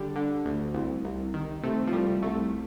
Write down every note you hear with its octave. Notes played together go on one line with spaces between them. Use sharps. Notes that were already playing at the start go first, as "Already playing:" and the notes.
Already playing: D3 G3
D3
D2
C2
C2
D#3
C3 A3
F3
C2 G3
C2 A3